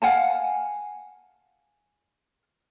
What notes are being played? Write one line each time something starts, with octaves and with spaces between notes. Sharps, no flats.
F5 F#5 G#5 A5